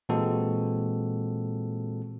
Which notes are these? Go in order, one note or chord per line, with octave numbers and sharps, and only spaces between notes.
A#2 E3 G#3 C4 F#4 A4